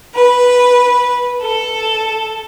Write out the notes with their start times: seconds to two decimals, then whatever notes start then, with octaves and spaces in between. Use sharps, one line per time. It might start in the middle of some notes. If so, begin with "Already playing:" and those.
0.15 B4
1.42 A4